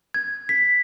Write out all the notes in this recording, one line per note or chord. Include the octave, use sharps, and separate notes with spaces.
G#6
B6